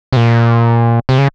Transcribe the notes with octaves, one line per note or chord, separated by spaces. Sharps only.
C3
A#2
C3
C#3